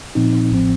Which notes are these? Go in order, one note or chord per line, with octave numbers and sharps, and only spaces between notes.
A#2 F3 C4 D#4
A1 A2 F3 C4